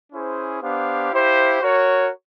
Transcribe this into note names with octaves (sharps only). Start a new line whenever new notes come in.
C#4 E4 G#4 C5
B3 D4 G4 C5 F5
E4 G4 C5 F5
F#4 A#4 C#5